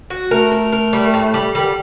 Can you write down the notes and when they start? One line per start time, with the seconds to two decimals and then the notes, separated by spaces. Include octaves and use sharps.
0.10 F#4
0.31 A3 A#4
0.52 A#4
0.72 A#4
0.93 G3
1.14 A2
1.34 G3
1.55 D#3 G3
1.65 D3